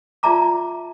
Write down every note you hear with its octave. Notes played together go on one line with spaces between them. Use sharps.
F4 D5 E5 A5 A#5 D6